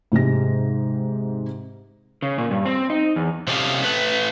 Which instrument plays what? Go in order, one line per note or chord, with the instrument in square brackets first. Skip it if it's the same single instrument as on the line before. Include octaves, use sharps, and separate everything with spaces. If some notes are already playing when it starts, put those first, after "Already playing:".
[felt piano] G#2 C3 G#3 G4 A#6
[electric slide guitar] C#3
A#2
G2
C4
D#4
E2
C3 C#4 G4 A4 D#5 F5
A3 B4